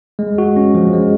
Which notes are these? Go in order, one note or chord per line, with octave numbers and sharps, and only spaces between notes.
G#3
F#4
C#4
F3
G#3